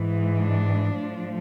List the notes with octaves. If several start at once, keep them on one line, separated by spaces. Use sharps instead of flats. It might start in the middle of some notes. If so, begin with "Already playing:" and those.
Already playing: G#2 E3
D4
A2 F3